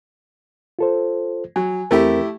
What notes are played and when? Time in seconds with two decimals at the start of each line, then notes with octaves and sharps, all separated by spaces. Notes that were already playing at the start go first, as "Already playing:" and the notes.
0.79 F4 A4 C5
1.56 F#3 G#5
1.91 E2 A3 C4 E4 G4 A#4